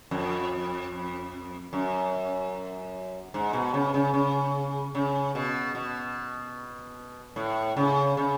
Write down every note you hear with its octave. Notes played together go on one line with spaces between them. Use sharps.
F2
F#2
G#2
B2
C#3
C#3
C#3
C#3
B2
B2
A2
C#3
C#3